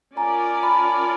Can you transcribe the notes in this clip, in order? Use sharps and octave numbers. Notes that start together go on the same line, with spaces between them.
C#4 F4 A#4 D5 G#5 A#5
A#5
A5 B5